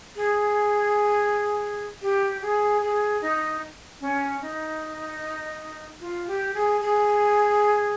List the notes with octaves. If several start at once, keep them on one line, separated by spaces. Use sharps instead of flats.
G#4
G4
G#4
G#4
D#4
C#4
D#4
F4
G4
G#4
G#4